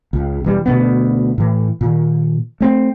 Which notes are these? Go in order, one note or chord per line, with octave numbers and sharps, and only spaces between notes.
C#2
E1 E3 G3
D2 B2 A#3 B3
A2 E3
A#2 D#3
A3 C4